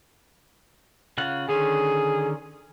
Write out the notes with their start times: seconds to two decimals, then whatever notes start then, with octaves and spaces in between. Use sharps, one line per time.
1.18 C#3 F4 F#5
1.49 D3 D#3 C#4 G#4